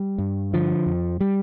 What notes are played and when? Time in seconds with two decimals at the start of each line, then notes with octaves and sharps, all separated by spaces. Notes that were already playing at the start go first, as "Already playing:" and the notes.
Already playing: G3
0.18 G2
0.53 D3 F3
0.86 F2
1.21 G3